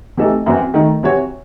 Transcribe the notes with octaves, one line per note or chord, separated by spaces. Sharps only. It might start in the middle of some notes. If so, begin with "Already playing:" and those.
C3 E3 A3 D#4 A4
F#2 E3 C4 F#4
D#3 A3 D#4
C3 E3 C4 F#4 C#5